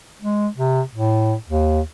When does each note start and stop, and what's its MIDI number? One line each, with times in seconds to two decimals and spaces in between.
0.22 0.48 56
0.57 0.81 48
0.95 1.35 45
1.48 1.81 39